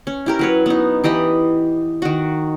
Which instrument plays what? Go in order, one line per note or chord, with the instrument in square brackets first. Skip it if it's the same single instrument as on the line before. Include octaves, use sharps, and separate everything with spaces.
[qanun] C#4
E4 G4 A#4
F#3 B4 C#5
B3 D#4
E3 G4 D#5 B5
D#3 F#4